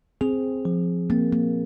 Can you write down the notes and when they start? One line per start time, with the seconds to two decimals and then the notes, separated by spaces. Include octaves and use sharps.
0.21 C4 G#4
0.65 F3
1.10 A#3 C4
1.32 A#3